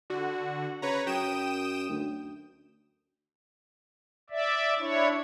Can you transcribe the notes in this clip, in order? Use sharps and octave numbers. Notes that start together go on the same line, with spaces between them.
D3 F#4
C#3 B4 C#5 A#5
F#2 G5 D#6 E7
D2
D5 E5
D4 E4 C#5